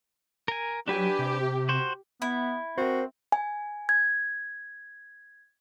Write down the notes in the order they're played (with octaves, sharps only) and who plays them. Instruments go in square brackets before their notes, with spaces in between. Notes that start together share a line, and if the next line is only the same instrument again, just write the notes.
[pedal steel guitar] A#4 G#5
[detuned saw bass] F#3 [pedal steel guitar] D4 B4 G#5 [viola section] G4
[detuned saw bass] C3
[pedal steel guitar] F#4 C5
[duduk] B3 [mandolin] E4
[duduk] C4 [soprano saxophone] F#4 [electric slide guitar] A#4 C5
[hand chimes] G#5
G#6